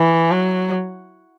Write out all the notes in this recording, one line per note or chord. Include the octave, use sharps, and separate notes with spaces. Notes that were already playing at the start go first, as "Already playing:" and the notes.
Already playing: E3
F#3